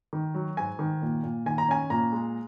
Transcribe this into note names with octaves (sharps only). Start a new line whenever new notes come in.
D#3
F#3
G#2 G#5
D#3
A#2
A#2
D#3 G#5
A#5
C#4 G#5
A#2 A#5
G#3